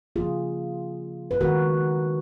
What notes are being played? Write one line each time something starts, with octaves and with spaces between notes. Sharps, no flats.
C#3 F3 A#3 F4 G#4
B4
D#3 G#3 B3 F#4 A#4